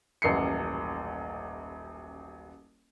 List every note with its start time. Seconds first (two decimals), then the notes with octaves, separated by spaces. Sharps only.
0.22 D#1 A1 F#2 C7 C#7